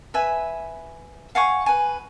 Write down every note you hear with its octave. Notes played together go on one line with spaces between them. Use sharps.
B4 E5 G#5
F5 F#5 G#5 C#6
B4 G#5